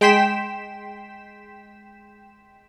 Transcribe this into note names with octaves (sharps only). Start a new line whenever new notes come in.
G#3 G5 C6 B6 E7